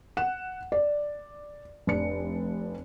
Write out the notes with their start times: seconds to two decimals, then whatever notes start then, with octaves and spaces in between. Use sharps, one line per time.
0.17 F#5 E7
0.72 D5
1.87 F1 D4 C#7